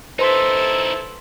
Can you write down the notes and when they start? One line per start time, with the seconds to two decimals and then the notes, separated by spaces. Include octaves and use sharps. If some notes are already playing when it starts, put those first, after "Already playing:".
0.19 D#4 E4 A4 B4 C5 C6 B6